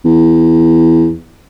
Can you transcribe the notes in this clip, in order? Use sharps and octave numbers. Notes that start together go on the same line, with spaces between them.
E2